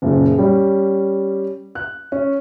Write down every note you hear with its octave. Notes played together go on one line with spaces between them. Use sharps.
F#1 A#2 C#3
G3 C#4
F#6
C#4